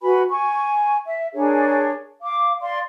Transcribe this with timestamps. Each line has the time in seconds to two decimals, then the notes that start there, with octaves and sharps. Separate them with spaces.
0.01 F#4 B4 G#5 B5
0.30 G#5 C#6
1.05 E5
1.34 D4 G#4 A#4 C#5
2.22 F5 D6
2.61 D5 F5 C6